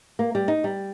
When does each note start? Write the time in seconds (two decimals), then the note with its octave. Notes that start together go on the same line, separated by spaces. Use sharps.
0.19 A#3
0.35 G3
0.48 D#4
0.64 G3